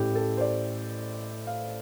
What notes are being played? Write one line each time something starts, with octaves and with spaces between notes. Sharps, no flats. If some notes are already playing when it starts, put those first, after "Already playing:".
Already playing: A1 A2 A3 G4
A4
C5
D5
F5